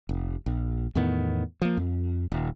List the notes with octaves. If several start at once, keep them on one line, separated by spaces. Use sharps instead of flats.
F1
A#1
E2 A2 D#3 B3
F3 A#3
F2
D#1